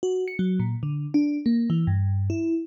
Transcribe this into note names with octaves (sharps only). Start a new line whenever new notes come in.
F#4
C#7
F#3
A#2
D3
D4
A#3
E3
G2
E4